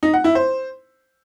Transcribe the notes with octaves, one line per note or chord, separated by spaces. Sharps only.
D#4
F#5
E4
C5